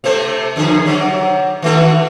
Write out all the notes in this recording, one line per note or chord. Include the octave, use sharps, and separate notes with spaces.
C3 A3 C5
F2 D3 G#4
C3 F#3
D#3 A3 F#4